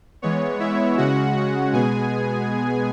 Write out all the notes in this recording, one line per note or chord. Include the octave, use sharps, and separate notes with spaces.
E3 G#3 B3 C#5
E4 E5
C#3 G#3 C#4 F#4 F#5
F#4 F#5
B2 G#3 B3 G#4 G#5